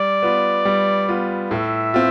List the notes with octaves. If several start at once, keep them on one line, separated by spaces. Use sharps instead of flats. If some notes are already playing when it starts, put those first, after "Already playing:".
Already playing: G3 D5
B3 F4
G3
B3 F4
A2 E5
C4 F4